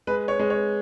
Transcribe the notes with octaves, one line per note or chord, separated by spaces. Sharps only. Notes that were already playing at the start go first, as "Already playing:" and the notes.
G#3 B4
C#5
G#3
C#5